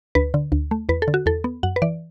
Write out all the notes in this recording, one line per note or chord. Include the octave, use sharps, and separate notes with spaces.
D2 B4
D3
D2
A3
E2 B4
A4
D3
F#4
E2 A4
B3
F#2 F#5
B4
E3 D5